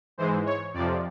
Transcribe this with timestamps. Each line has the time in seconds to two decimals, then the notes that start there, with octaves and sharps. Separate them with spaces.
0.18 G#2 E3 G#3 C5
0.46 C#5
0.74 F2 C3 F3 D5